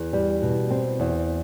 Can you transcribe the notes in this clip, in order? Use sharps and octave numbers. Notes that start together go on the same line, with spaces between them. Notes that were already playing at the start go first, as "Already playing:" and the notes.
Already playing: E2
G3
B2
C4
E2